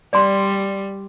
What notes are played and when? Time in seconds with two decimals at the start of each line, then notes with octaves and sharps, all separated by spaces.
0.13 G3 D5 C6